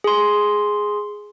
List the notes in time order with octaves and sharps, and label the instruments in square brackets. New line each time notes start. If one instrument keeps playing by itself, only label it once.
[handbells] G#4 C6